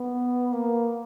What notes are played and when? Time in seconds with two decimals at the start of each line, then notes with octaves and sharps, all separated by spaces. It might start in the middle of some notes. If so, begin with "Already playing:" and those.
Already playing: B3
0.53 A#3